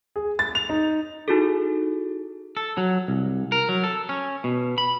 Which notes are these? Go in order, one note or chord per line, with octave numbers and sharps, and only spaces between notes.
G#4
A6
F7
D#4
D#4 E4 F#4 G#4 A4
A4
F#3
C2
A#4
F#3
A4
C#4
B2
B5